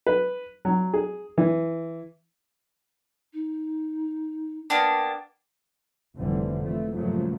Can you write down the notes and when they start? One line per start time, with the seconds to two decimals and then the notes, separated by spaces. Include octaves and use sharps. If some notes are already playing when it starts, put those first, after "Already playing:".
0.07 B4
0.65 F#3
0.94 G#4
1.38 E3
3.33 D#4
4.70 A#3 B3 D4 G5
6.16 F1 A2 D3 E3 G3 C4
6.61 E3 F3 A3
6.93 G2 A#2 C#3 F3 F#3 A3